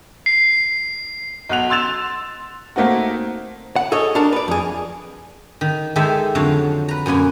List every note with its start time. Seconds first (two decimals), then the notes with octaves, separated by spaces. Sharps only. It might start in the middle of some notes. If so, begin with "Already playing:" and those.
0.26 C7
1.49 B1 F#4 F#6 F7
1.70 C6 E6 A6 E7 F7
2.76 A3 A#3 C4 D#4 F#4
3.76 F#5
3.92 G#4 A4 C#5 D#5
4.15 D4 F#4 A#4 A5
4.33 B4 D5
4.48 F2 G#4
5.61 D#3
5.96 D#3 G#3 G4 A4 E5 G#5
6.35 F2 D3 F#3 C#5 F5
6.88 B4 A#5
7.06 F#2 B2 A#3 G#5